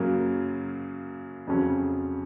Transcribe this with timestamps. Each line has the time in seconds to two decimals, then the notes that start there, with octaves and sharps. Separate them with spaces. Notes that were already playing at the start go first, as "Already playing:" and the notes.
Already playing: F#2 C#3 F#3 A#3
1.47 F2 C#3 F#3 C#4